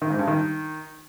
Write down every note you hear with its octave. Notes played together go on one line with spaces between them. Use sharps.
D#3
G#2
G2
D#3